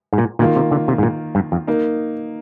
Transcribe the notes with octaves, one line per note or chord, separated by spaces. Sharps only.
G#2
A#2
A#2 D#3 A#3 F4
C3
D3
C3
G#2
A#2
G2
F2
A#3 D#4